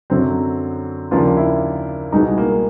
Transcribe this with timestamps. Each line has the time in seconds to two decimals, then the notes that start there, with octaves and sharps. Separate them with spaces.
0.10 F#2 D3 F#3 C4
1.11 D#2 C#3 F3 A#3 D4 F4
1.37 E4
2.12 C2 B2 G#3 B3 D#4
2.38 A#3